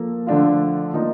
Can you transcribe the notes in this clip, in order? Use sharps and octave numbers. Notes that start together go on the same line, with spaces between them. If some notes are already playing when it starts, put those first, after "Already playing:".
Already playing: F3 A#3 A4
D3 F3 A3 D4 F4
F3 A#3 D#4